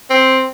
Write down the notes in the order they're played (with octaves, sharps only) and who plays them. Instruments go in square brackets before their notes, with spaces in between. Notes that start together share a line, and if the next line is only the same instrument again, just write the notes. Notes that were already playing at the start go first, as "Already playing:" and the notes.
[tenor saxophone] C4